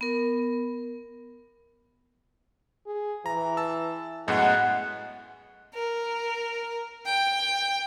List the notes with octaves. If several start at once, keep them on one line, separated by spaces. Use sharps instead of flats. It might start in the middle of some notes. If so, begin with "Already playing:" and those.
B3 A#4
G#4
E3 A#5
A5 E6
F#2 A2 G#3 B3 F#5
A#4
G5